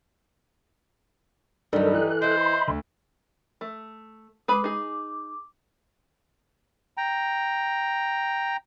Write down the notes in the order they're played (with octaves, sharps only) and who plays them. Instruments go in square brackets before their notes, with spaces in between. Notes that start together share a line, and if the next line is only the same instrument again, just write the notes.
[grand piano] G2 D#3 F#3 [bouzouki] G3 D#4 [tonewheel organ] A4 A#4
[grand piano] E3 [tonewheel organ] A4 F#6
[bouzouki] E4 D#5 [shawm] C5
[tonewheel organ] B5 C6
[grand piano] D2
[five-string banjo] A3
[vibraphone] G#3 D6 [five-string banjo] G#4 B4 B5
[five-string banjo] D#4 G#4 [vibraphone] D6
[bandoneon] G5 A#5